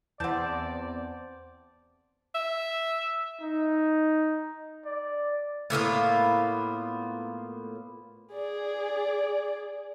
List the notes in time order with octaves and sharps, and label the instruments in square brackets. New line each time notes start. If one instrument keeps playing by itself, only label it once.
[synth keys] E2 [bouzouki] C4 A5 [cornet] D5 [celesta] F#5 G6
[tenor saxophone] E5
[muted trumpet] D#4
D5
[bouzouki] A2 A#3 B3 F4
[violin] G#4 D5